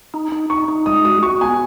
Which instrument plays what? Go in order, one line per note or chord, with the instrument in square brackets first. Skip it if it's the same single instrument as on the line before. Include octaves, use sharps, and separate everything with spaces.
[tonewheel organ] D#4
D#4
[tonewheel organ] D#4 [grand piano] C#6
[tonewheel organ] D#4
[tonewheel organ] G#3 [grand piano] D#6
[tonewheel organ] F#4 [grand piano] D#6
[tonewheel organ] F#4 [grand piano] C#6
[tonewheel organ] B3 [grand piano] G#5